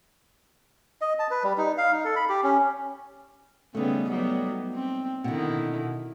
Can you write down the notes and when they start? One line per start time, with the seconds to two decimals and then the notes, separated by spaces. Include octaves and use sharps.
1.01 D#5
1.19 A5
1.31 B4
1.43 G3
1.58 D#4
1.78 F5
1.92 D#4
2.05 A4
2.16 B5
2.29 G4
2.43 C#4
3.75 C#3 G3 A3 B3 D#4
4.09 F#3 G3 B3
4.75 C4
5.24 B2 D3 D#3 E4